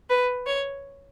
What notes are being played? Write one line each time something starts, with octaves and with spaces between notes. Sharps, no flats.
B4
C#5